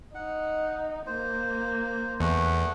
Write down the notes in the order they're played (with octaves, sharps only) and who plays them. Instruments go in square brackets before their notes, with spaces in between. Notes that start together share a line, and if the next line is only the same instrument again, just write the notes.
[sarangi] D#4 [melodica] F#5
[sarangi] A#3 [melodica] C5
[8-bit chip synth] E2 [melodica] A3 F#5